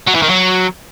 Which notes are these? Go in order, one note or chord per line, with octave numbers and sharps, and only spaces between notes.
F#3
E3
D#3
F#3